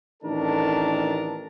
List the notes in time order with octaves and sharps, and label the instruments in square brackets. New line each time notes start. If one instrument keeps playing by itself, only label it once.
[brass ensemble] A1 D#3 D4 A4 A#4 A5